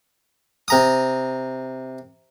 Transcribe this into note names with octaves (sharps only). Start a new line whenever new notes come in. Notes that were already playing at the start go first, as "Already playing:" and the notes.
C3 A#5 D#6